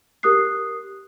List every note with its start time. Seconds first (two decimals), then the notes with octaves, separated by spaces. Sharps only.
0.23 G4 A#4 D#6 F#6 C7